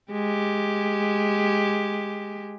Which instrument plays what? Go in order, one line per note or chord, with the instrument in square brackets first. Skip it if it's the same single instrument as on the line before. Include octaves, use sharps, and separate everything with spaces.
[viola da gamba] G#3 G4